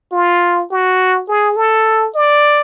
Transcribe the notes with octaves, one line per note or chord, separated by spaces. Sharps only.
F4
F#4
G#4
A4
D5